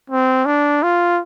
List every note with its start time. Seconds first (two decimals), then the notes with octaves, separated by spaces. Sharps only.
0.10 C4
0.46 D4
0.83 F4